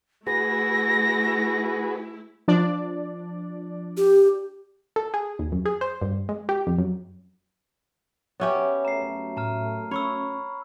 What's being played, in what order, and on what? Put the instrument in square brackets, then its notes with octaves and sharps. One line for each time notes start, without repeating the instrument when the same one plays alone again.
[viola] A3 E4 [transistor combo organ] F#4 G#4 B4 [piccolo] A#6
[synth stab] F3 D4 D5
[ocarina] G4
[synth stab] A4
G#4
D#2
F#2
G#4
C5
G2
G#3
G4
F2
F#2
[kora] B3 C#4 G4 [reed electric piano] C#5 E5 G#5
[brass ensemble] F#2 A3 [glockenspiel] A#5 C7
[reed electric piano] A2 [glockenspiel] A5 A#5 F6
[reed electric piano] C#4 [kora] C#5 [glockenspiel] B5 C#6 E6